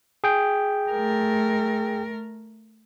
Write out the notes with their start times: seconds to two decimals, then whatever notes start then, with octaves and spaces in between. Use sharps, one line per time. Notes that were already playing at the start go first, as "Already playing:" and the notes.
0.24 G#4 G5
0.91 A3 A#4